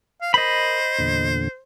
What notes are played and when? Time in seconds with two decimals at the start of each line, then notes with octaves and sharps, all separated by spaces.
0.21 F5
0.34 A#4 C5 D#5 B5
0.99 E2 A#2 D3